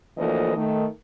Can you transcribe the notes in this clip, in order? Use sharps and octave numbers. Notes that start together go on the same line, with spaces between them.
D2 E3 F3 A#3 A4 D#5
D#3 A3